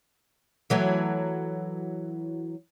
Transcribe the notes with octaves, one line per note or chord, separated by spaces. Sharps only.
E3 F#3 A3